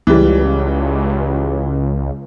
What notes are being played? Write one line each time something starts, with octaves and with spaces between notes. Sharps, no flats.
C#2 E3 G3